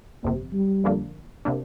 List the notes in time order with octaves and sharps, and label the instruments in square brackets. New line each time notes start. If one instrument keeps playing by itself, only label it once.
[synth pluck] G1 F2 C3 [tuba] A#3
[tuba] G3
[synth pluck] F2 D3 F3 A#3 D4
C3 A#3 D4